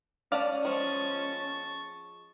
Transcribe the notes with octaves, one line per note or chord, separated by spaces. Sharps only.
C#4 D5 F5 F#5 A5
F3 G#3 A5 C#6